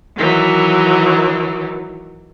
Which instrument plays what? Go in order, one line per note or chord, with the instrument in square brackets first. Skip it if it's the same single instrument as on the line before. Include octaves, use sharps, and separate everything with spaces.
[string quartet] D#3 E3 F#3